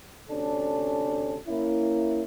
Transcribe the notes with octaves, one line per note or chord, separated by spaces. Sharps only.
D2 C3 C#4 D4 A4
A#3 C#4 E4